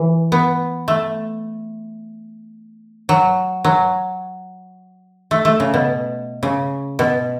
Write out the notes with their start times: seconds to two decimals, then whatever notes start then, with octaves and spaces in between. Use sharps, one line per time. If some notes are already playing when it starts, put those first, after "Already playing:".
Already playing: E3
0.32 B3
0.88 A3
3.09 F#3
3.64 F#3
5.31 A3
5.45 A3
5.60 C#3
5.74 B2
6.43 C#3
6.99 B2